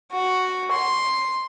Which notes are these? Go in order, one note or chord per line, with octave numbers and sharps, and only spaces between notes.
F#4
C6